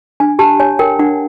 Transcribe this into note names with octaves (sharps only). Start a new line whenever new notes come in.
D4 G#5
G4 A5
C#5 G#5
A#4 G5
D4 F#5